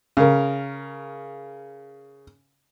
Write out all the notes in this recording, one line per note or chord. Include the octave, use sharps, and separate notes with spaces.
C#3 A#4